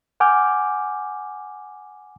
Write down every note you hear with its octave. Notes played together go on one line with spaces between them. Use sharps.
F#5 G#5 D6 F6 G6